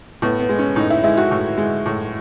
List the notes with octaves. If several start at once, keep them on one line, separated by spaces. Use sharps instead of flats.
A2 B3
B3
G#3
C#4
A2 D#4
E4
G#3 E4
F#4
A2
G#3
A2